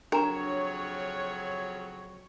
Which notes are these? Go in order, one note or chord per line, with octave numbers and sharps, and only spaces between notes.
F2 C#3 F#3 D4 A#4 C#5 A#5